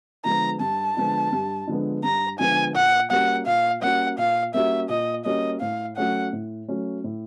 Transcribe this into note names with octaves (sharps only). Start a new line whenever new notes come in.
D3 F3 G#3 B3 A#5
G2 A5
D3 F3 G#3 B3
G2
D3 F3 G#3 B3
G2 A#5
D3 F3 G#3 B3 G#5
A#2 F#5
G3 A#3 C#4 F#4 F#5
A#2 F5
G3 A#3 C#4 F#4 F#5
A#2 F5
G3 A#3 C#4 F#4 E5
A#2 D#5
G3 A#3 C#4 F#4 D#5
A2 F5
F#3 A3 C#4 F#5
A2
F#3 A3 C#4
A2